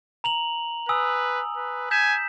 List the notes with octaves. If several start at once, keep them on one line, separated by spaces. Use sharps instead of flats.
A#5 F7 F#7
B4 G#5 D#6 E6
B4
G#5 G6 B6 E7